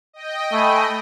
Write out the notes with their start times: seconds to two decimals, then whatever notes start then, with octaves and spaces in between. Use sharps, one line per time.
0.13 D#5 G5
0.53 A3 G#5 B5